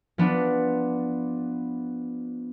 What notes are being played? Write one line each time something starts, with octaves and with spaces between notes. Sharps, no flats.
F3 B3 D4